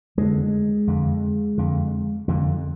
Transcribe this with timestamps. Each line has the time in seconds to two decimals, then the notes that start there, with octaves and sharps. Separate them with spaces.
0.17 F2 D3 G#3
0.87 F2 D3
1.58 F2 D3
2.28 F2 D3